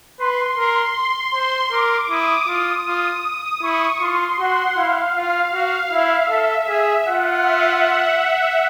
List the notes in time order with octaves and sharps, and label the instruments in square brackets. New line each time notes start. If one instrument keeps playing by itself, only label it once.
[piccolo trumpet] B4 [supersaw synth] C6
[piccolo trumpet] A#4
[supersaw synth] C6
[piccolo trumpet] C5 [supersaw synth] C6
[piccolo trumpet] A#4 [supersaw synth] D6
[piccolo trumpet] E4 [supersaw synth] D#6
[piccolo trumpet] F4 [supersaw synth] D#6
[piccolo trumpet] F4
[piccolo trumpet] E4 [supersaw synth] C#6
[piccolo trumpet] F4 [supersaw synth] C6
[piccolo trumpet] F#4 [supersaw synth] F#5
[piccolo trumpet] E4 [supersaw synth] F5
[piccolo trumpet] F4
F#4
[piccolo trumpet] E4 [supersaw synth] E5
[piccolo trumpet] A4
[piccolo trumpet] G#4 [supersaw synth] E5
[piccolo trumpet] F4 [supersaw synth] F#5
[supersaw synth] E5